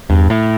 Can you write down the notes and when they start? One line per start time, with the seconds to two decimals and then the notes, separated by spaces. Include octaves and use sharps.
0.10 E2 G2
0.30 A2